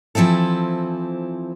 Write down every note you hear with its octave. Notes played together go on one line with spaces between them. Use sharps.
E3 F3 C4 E4 A4